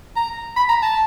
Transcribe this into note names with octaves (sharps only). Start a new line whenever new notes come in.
A#5
B5
A#5
A5